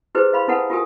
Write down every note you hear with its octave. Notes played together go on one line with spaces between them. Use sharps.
E4 G4 G#4 B4 C5 D#5
B4 D#5 F5 B5 C6
D#4 E4 A4 B4 F#5 G5
F4 G4 A#4 G#5 D#6